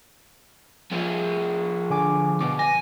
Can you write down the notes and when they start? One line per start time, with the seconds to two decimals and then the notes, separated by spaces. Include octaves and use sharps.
0.91 F3 G#4
1.90 D3 G#5 D6
2.41 B2 D6
2.59 G#5 A#6